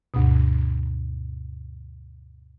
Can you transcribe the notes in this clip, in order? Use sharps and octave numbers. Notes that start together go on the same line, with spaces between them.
D2 G2 B2